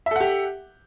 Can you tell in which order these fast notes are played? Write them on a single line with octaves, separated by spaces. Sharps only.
E5 A4 F#5 G4